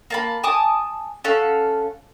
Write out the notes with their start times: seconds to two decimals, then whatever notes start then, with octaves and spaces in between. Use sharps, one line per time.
0.10 A#3 A5 B5
0.44 G#5 A5 D6 D#6
1.24 C#4 A4 F5 F#5